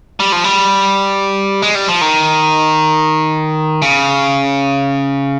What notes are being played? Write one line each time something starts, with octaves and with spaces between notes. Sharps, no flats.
G3
F3
G3
G#3
G3
F3
D#3
C#3